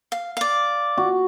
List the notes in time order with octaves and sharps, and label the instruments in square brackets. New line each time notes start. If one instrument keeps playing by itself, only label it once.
[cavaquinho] F5
D5 F5
[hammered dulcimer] F#4